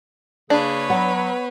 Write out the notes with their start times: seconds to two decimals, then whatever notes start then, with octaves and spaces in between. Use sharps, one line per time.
0.50 C#3 A#3 D4 G#4 B4 C#5
0.90 F#3 B3